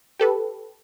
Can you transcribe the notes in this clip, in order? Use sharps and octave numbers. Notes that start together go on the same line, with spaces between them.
G4 A4 B4